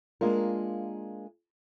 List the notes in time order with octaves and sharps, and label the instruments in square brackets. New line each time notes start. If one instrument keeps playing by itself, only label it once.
[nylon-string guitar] G#3 A#3 D4 F4 A#4